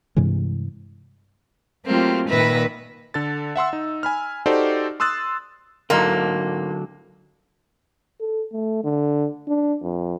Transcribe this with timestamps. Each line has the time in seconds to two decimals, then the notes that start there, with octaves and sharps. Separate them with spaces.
0.17 G2 C3 E3 G#3
1.85 F#3 A3 A#3 C4 F4 G4
2.29 A#2 D#3 B4 E5 B5 A#6
3.14 D3 A4 A6
3.56 E5 F#5 C6 E6
3.73 D#4
4.03 G#5 B5 F6
4.46 D#4 F#4 G4 A4 C5 D5
5.00 C6 D#6 E6 F#6 A6
5.90 G#2 D3 F#3 A#3 A4
8.21 A4
8.53 A3
8.85 D3
9.48 D4
9.82 F2